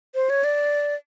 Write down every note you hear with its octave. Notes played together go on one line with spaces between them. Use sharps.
C5
C#5
D5